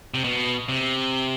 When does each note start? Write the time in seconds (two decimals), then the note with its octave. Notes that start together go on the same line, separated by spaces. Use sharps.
0.14 C3
0.24 B2
0.69 C3